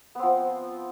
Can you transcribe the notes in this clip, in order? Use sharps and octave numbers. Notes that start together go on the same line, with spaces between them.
F3 B3 C4